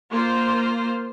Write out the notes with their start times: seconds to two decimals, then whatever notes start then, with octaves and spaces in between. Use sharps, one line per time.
0.11 A#3 F4 C5